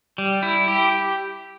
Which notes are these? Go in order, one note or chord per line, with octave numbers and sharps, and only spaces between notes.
G3
E4
G4